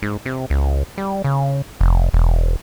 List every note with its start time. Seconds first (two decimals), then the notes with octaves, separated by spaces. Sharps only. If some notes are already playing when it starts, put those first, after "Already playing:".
0.02 G#2
0.26 C3
0.50 C#2
0.98 G3
1.24 C#3
1.81 F1
2.14 E1